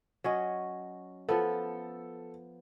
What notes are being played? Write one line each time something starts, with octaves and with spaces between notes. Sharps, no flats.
F#3 C#4 D#5
F3 B3 A4